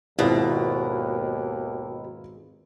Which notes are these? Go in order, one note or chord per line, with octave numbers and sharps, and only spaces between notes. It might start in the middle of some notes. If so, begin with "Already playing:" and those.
G#1 D#2 B2 E4 F4